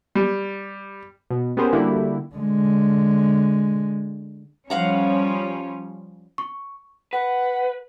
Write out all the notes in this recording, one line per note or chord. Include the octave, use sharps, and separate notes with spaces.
G3
B2
B3 C#4 G4 G#4 A#4 C5
D3 G3 A#3 E4 F#4 G4
D3 G#3
F3 G3 C#4 F5 F#5 A#5
C#6
B4 F#5